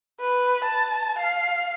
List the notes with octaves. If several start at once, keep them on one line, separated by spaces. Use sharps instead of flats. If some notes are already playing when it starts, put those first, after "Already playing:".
B4
A5
F5